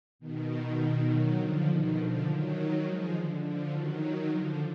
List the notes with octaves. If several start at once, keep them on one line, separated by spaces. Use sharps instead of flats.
B2 D#3
D#3 F#3
D3 F3
B2 D#3
D3 F3
D#3 F#3
F3 G#3
D3
D3 F3
D#3 F#3
D3 F3